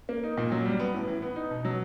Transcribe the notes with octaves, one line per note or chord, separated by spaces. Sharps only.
A#3
D#4
A#2
F#3
G3
B3
A2
E3
B3
D#4
B2
F#3